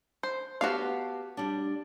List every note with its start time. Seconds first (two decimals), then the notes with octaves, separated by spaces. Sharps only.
0.23 C5
0.61 B3 F#4 G4 F5 A5
1.37 G3 D4